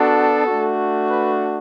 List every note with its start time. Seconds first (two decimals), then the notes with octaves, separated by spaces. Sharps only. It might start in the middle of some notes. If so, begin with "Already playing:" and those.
Already playing: B3 D4 F#4 A4
0.47 A3 D4 F#4
1.10 B4